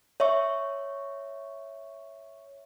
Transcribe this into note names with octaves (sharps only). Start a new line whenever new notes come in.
C#5 E5 C#6